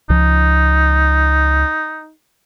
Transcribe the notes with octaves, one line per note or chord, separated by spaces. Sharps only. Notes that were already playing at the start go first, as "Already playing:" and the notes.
C#2 F3 D#4